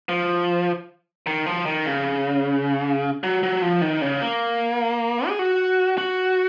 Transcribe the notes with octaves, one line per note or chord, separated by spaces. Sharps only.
F3
D#3
F3
D#3
C#3
F#3
F#3
F3
D#3
C#3
A#3
G#4
F#4
F#4